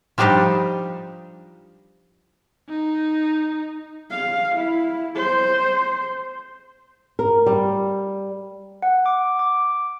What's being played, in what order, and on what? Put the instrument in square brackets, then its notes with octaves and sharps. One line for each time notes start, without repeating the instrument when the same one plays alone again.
[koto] F3 G3 D4 D#4 G4
[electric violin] D#4
[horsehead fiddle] F5
E4
C5
[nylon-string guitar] A#4
G3
[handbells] F#5
D6
D6